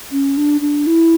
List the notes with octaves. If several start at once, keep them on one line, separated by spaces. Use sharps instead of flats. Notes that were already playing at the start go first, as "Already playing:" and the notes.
C#4
D4
D4
E4